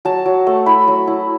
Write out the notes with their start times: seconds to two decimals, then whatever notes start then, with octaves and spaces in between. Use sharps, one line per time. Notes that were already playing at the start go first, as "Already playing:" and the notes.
0.05 F#3 A5
0.26 F#3
0.47 A3
0.66 E4 B5
0.88 F#3
1.07 E4